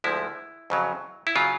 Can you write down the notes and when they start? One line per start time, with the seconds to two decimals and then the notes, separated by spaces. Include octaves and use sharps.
0.04 D2 D3 F3 G#3 E4
0.70 F2 C#3 F#3
1.27 E4
1.36 C#3 F#3 F4